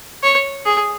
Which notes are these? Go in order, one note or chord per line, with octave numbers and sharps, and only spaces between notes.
C#5
G#4